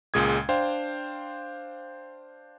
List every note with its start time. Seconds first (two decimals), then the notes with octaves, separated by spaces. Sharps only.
0.14 C#2 A#2 G#3 D#6 G#6
0.49 D4 C5 F5 G5